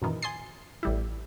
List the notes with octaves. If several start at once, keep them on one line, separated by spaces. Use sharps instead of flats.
F#2 A#2 D#3 E3
G#5 C6 D#6 A6 C7
A1 G3 E4